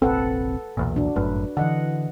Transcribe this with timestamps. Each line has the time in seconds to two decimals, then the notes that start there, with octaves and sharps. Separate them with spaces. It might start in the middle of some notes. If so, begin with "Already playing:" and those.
0.02 F1 A#1 C4 A4 B4 F#5
0.77 B1 E2 A#2
0.96 D4 F#4
1.16 G1 F#2 A2 B4
1.57 D3 E3 D#5 F#5